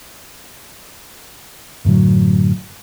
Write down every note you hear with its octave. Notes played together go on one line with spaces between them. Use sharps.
F#2 A2 D3 F#3